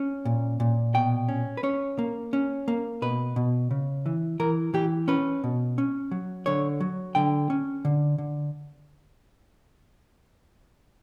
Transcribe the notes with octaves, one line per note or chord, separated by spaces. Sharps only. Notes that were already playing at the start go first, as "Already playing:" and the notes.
Already playing: C#4
A#2
A#2
B2 G5
C#4
B4
C#4 C#5
A#3
C#4
A#3
B2 B4
B2
C#3
E3
E3 A#4
E3 G4
C#4 B4
B2
C#4
F#3
D3 C#5
F#3
D3 G5
C#4
D3
D3